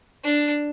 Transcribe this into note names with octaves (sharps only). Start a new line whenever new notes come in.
D4